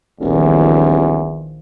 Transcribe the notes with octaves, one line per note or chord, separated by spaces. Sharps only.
D#1 A#1 E2 D#3 F3